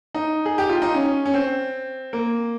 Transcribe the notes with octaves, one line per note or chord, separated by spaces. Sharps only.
D#4
G#4
G4
F4
D#4
C#4
C#4
C4
A#3